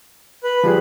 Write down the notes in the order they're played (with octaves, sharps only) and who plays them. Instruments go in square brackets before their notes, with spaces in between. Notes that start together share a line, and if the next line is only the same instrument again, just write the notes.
[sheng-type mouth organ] B4
[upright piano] F3 G3 G#4